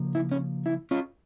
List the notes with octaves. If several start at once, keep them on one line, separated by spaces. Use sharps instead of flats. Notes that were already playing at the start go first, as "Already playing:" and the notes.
Already playing: C#3 F3 A#3
E4
C#4
E4
C#4 F4